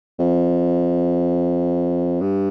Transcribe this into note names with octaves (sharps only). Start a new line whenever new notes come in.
F2
G2